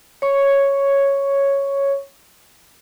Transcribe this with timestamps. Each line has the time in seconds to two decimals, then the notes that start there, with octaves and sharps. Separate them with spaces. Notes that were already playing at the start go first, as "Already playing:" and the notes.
0.22 C#5 C#6